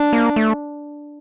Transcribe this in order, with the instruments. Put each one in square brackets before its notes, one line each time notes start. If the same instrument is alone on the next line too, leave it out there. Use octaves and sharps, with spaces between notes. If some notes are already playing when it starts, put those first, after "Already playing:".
Already playing: [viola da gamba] D4
[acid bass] A#3
A3